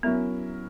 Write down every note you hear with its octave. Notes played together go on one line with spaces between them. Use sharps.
F#3 B3 C#4 E4 A#4 E5